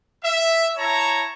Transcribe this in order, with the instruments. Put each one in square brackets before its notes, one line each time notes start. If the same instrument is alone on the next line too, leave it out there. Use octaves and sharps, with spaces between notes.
[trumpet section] E5
E4 C#5 A5 A#5